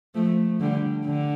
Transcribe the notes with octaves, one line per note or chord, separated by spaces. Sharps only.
F3 A3
D3 G3
D3